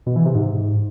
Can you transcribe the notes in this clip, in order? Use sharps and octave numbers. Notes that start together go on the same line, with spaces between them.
B2
E3
C3
G#2